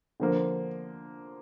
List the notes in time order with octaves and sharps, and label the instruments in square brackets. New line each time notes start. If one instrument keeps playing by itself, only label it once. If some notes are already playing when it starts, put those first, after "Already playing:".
[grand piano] D3 F3 A#3